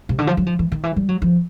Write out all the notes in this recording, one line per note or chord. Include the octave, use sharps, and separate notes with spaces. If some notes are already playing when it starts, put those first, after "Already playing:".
C3
D3
F3
F#3
F3
E3
D#3
E3
G3
F#3
F3